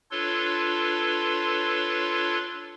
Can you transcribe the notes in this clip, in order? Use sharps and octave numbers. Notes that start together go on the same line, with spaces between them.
D4 F4 A4 B4 C#5 C6